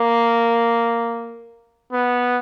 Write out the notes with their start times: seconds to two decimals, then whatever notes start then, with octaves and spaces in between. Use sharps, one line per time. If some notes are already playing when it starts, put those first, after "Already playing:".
Already playing: A#3
1.93 B3